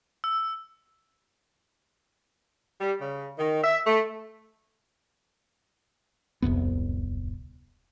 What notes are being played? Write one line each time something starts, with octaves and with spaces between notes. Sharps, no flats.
E6
G3
C#3
D#3
E5
A3
D1 C2 F2 B3